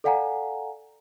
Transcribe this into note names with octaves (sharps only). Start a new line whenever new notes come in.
A4 D5 F5 F#5 G#5 A#5